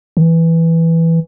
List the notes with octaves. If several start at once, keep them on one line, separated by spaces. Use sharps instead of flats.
D#3
E3